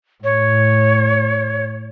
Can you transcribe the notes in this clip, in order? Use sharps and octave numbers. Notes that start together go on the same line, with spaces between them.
A2 C#5